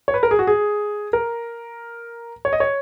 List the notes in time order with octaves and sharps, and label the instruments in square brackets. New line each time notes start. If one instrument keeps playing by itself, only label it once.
[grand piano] C#5
B4
A#4
G#4
F#4
G#4
A#4
C#5
D#5
C#5